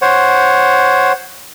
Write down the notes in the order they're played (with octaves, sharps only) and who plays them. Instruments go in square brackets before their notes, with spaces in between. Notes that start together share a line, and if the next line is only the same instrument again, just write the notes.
[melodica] C5 C#5 F#5